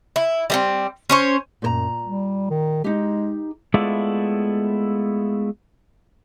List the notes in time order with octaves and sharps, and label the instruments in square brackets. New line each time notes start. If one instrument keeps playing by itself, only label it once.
[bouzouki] E4
G3 A#3 C4
C#4 C5 C#5
[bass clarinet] F#2 [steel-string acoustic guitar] A#2 C5 A#5
[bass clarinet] G3
D#3
[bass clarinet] G#3 [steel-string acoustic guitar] D#4 G4
[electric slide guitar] G#3 A3 B3 E4 F4 D5